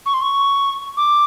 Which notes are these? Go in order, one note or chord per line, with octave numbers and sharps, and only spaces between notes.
C#6
C6
C#6
D6